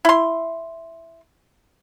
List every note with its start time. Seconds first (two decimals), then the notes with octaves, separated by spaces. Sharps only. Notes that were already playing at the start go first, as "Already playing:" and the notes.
0.05 E4 C6